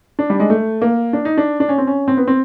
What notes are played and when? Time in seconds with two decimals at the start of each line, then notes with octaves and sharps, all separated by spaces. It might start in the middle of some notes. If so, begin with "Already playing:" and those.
0.19 D4
0.30 G3
0.40 G#3
0.50 A3
0.82 A#3
1.13 D4
1.25 D#4
1.38 D4
1.60 D4
1.69 C#4
1.78 C4
1.87 C#4
2.08 C4
2.17 B3
2.28 C4